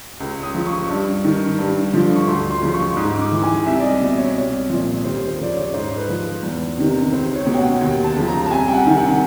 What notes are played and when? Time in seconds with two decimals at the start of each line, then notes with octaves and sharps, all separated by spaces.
0.20 C#2
0.43 D#6
0.55 C#3 F3
0.66 C#6
0.89 G2
1.24 D#3
1.58 G2
1.93 D3 F3
2.16 C#6
2.28 D2 C6
2.51 C6
2.62 C#3 F3
2.74 C#6
2.96 G#2 D#6
3.20 D6
3.32 E3
3.43 G#5
3.66 C2 E5
3.79 D5
3.83 D#5
4.01 B2
4.17 C#5
4.35 C2
4.70 A#2 F3
5.04 D#2 C5
5.28 C5
5.39 C#3 F3 D5
5.51 C#5
5.73 G#2 C5
5.97 B4
6.08 F3
6.43 E2
6.77 C3 D#3
7.12 C#2 C5
7.35 C#5
7.47 B2
7.54 G5
7.58 F#5
7.81 D#2 G5
8.04 A5
8.16 C#3 F3
8.27 A#5
8.46 A5
8.51 C2 G#5
8.68 G5
8.74 F#5
8.86 C3 D#3
8.97 F#5